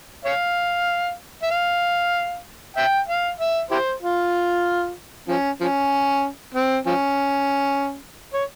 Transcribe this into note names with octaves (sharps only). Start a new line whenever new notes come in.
C#5 F5
E5
F5
E5 G5
F5
E5
E4 G4 C5
F4
F3 C#4
F3 C#4
C4
F3 C#4
C#5